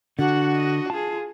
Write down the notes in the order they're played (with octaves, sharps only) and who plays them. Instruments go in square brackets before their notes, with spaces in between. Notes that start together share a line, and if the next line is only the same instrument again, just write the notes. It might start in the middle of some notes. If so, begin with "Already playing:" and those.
[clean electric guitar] D3 [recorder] D4 [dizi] F#4 [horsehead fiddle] F#5
[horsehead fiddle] D#5
[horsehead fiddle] F4 G#4 [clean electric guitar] A5